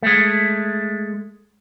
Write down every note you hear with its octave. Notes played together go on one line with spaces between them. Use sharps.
G#3 A3